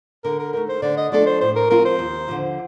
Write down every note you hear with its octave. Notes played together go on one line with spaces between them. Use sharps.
D3 A#4
A#4
A3 D#4 A#4
C5
D3 D5
D#5
F3 A3 D4 A4 D5
C5
A2 C5
A#4
F3 C4 F4 A#4
C5
D#2
D3 F3